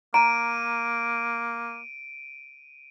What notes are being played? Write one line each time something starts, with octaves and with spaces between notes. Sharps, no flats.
A#3 A#5 D7 D#7